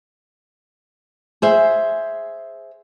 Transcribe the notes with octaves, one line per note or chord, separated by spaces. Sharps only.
G#4 C5 E5